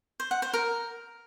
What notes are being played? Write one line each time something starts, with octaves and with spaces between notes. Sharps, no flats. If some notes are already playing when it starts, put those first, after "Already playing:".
C5
F#5
C5
A#4